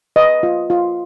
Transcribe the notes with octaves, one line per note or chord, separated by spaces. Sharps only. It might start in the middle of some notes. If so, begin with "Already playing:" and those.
B4 D#5
F4
F4